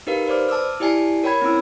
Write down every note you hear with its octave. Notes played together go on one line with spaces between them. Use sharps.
D#4 G4 A#4 B4 F5
B4 C5 D5 D6 F6
A5 D6 E6 F6
E4 G4 D5 G#5 A5 C7
A#4 C#5 G5 B5 G#6
C4 C#4 E4 E6